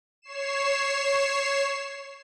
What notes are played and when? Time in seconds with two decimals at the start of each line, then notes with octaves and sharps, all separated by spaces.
0.22 C#5 C7 E7